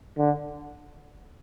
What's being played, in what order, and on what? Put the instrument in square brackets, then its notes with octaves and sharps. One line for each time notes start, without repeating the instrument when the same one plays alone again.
[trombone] D3